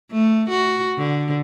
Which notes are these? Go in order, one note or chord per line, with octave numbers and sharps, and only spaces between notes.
A3
F#4
D3